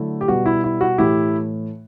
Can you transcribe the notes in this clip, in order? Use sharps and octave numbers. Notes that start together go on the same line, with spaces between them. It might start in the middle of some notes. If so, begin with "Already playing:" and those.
Already playing: D3 F#3 A3 E4
G4
B2 G3 B3 F#4
E4
E4
F#4
A2 E3 A3 E4 G4